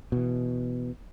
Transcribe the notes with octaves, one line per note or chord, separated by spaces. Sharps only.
B2 E3